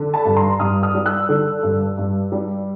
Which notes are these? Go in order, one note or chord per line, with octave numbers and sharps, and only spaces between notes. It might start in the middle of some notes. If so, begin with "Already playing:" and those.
Already playing: D3
A5 B5
G2
A#5 C6
G2 D#6 F6
D#6 F6
G3
E6 F#6
D3
G2
G2
G3